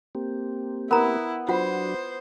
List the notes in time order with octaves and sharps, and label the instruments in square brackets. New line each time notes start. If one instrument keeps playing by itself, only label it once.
[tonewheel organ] A#3 C4 G4
[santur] B3 [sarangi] E4 [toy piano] A#4 A#5
[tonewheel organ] F#3 D4 F#4 [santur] B3 [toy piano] F4 F#5 [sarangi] C5